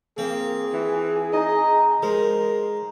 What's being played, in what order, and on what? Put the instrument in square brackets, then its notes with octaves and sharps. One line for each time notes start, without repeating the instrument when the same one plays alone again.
[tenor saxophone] A#3 [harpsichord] C4 [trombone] G#4
[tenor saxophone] E3 [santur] G#5
[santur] D#4 A#5 [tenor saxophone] D#5
[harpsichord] G#3 [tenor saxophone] A#4 [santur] C5